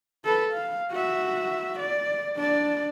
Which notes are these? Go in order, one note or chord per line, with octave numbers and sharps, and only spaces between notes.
A4 B4
F5
F#4 E5
D5
D4 D5